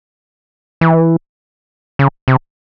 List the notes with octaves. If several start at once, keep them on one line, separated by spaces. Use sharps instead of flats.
E3
C#3
C3